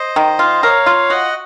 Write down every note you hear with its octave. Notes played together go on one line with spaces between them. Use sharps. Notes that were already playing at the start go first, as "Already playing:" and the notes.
Already playing: C5 D#5
D#3
F4
A#4 C#5 F5
F4
F#4 D#5 F#5